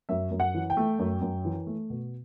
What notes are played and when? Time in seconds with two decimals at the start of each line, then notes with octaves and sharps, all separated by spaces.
0.09 F#2 E5
0.31 F#2
0.40 F#5
0.54 E3
0.70 G5
0.77 A3
0.99 F#2
1.22 F#2
1.45 E3
1.67 A3
1.90 B2